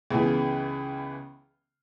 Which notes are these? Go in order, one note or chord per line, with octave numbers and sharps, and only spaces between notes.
C#2 C#3 E3 B3